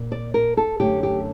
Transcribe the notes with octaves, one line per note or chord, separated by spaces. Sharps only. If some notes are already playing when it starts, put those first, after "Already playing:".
Already playing: A#2
D5
A#4
A4
F#2 D3 A3 G4
G4